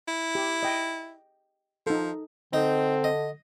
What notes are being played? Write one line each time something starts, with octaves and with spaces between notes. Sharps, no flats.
E4
G4
D#5 G5
F3 D#4 A4
D3 C4 D#4
D#5